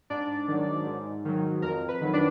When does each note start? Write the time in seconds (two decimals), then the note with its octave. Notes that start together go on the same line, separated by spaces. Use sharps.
0.10 G#2 D4 D5
0.48 D#3 F#3
0.86 G#2
1.25 D#3 F#3
1.62 F2 A#4
1.89 B4
2.01 D#3 F#3
2.13 D4 D5